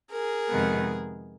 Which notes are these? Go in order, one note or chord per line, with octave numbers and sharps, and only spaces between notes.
G#4 A#4
F2 C3 D#3 G#3 B3